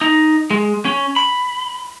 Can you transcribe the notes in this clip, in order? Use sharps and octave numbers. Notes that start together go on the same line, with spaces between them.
D#4
G#3
C#4
B5